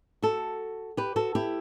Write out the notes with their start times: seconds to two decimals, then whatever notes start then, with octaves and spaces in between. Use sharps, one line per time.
0.22 F#4 A4
0.97 G4 B4
1.16 F#4 A4
1.35 E4 G4